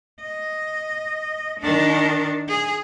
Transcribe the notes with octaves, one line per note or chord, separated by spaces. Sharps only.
D#5
D#3 D4
G#4